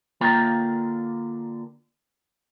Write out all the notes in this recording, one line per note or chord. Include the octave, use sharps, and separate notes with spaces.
D3 A#3 F4 A#4 G5 A#5